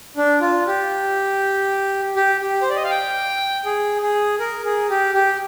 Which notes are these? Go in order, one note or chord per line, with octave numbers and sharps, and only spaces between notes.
D4
F4
G4
G4
G4
C5
D5
D#5
F5
G5
G#4
G#4
A#4
G#4
G4
G4